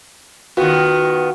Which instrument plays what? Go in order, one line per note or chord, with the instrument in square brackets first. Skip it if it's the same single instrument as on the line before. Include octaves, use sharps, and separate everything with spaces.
[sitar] D#3 B3 [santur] F4 F#4 G5